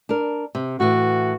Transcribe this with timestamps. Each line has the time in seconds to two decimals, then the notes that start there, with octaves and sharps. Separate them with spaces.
0.09 D4 A#4
0.55 C3
0.80 A2 E3 F#4